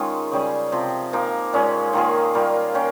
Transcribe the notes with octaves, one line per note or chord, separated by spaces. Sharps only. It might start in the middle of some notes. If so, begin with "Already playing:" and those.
Already playing: D#3 G#3 C#4 D#4 F4
C#3 G3 C#4 G#4
C3 F3 C4
F3 A#3 D#4
A#2 G#3 C#4
D#3 A#3 F4 G#4
G3 A#3 F4
A#3 C#4 G4